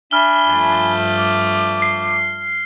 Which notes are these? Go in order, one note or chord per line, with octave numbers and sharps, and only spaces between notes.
D4 E5 G#5 B5 F6 G7
G2 F3 A3
D6
C7